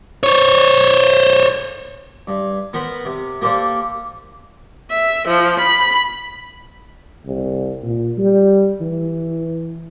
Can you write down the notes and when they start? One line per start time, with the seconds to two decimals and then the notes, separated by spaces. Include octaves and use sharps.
0.23 C5 C#5
2.27 G2
2.73 B3 A#4 C5 B5
3.05 C3
3.41 A#3 G4 A4 C5 D5 F5
4.90 E5
5.25 F3
5.58 B5
7.26 C2
7.83 A#2
8.18 G3
8.81 E3